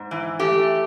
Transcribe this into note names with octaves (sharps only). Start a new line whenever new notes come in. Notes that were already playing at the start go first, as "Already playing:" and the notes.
Already playing: G#2
E3
A3 G4